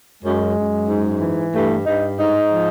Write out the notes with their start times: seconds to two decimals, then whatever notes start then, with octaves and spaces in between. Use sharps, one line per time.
0.23 F#2 G#3
0.56 F#2
0.88 G#2
1.20 E3
1.54 G2 A3
1.85 G2 D#4
2.18 G#2 D#4
2.51 F3